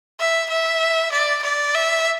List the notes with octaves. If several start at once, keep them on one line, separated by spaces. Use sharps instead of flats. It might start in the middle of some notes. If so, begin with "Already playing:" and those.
E5
E5
D5
D5
E5